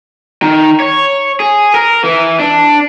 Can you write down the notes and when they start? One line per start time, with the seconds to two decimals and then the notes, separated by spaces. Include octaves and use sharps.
0.42 D#3
0.80 C#5
1.40 G#4
1.74 A#4
2.04 E3
2.40 D4